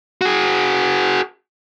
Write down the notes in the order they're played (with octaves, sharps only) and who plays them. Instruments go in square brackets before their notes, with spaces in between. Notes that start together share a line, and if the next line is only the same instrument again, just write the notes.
[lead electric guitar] F#4 G#4